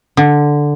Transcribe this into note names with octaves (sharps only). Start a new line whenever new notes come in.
D3